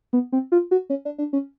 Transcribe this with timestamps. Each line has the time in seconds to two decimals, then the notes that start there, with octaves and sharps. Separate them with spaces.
0.13 B3
0.32 C4
0.52 F4
0.71 F#4
0.90 C#4
1.05 D4
1.18 D4
1.33 C#4